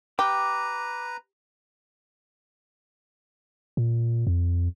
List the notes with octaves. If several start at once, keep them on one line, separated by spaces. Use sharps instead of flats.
G4 B4 A#5 D6
A#2
F2